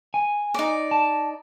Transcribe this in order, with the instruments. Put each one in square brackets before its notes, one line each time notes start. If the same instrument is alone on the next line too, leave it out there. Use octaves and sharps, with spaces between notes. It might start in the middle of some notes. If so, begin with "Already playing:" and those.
[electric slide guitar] G#5
[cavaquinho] D#4 D5
[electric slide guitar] A5